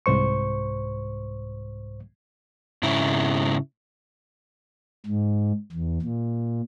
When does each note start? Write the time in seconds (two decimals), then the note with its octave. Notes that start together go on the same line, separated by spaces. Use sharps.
0.06 C2 G#2 C5 C#6
2.83 G#2 C#3 E4
5.06 G#2
5.72 E2
6.02 A#2